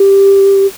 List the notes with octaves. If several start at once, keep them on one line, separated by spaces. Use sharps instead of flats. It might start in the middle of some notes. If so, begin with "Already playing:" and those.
Already playing: G4